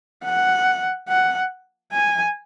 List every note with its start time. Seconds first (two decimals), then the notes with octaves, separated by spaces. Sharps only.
0.25 F#5
1.09 F#5
1.92 G#5